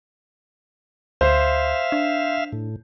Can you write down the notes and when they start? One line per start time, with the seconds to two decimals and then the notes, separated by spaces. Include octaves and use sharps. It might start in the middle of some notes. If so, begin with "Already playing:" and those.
1.21 D2 C5 E5 F5
1.92 D4
2.52 A2